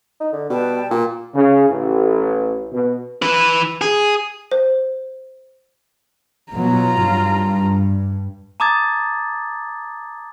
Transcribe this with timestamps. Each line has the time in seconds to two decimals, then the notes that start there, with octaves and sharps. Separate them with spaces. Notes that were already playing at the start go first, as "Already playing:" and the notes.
0.20 D#4
0.33 D3
0.50 B2 G3 B4 G5 A5
0.91 A#2
1.34 C#3
1.68 A1
2.72 B2
3.22 E3 B4
3.81 G#4
4.51 C5
6.52 B2 F#3 F4 A#5
7.01 G2
8.60 A5 A#5 D6 D#6 G#6 A6